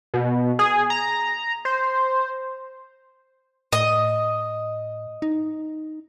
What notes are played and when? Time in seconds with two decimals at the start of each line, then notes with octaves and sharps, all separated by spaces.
0.14 B2
0.59 G#4
0.90 A#5
1.65 C5
3.73 A2 D#5
5.22 D#4